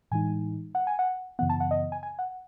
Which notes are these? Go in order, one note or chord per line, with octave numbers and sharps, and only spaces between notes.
A2 E3 G#3 D#4 G#5
F#5
G#5
F#5
F#2 C#3 E3 B3 F#5
A5
F#5
D#5
G#5
G#5
F#5